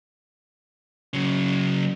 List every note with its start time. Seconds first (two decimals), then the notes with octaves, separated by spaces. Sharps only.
1.14 C#3 F#3